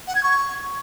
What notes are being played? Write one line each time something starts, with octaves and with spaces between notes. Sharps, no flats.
F#5
G#6
C#6